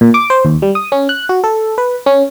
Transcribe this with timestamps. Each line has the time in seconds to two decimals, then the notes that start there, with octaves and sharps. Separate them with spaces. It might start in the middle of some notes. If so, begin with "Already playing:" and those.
0.01 A#2
0.14 D6
0.30 C5
0.45 D#2
0.62 G3
0.75 D#6
0.92 C#4
1.09 F#6
1.29 F#4
1.44 A4
1.78 B4
2.06 C#4